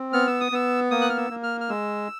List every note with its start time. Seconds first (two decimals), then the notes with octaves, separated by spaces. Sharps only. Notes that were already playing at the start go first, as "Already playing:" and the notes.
Already playing: C4
0.13 B3 F6
0.27 E6
0.41 D#6
0.52 B3 E6
0.91 A#3 D#6
1.01 F#6
1.10 F6
1.17 E6
1.30 A#3
1.43 F6
1.61 F6
1.69 G#3 E6